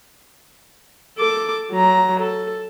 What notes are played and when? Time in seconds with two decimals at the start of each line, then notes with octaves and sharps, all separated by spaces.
1.18 A4 D6
1.72 F#3 A#5
2.21 A4